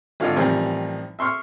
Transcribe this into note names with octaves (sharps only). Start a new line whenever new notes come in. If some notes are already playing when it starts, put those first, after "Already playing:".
G#1 D3 F4 D#5
A1 C3 D#3 F3 G3
E5 C6 C#6 F6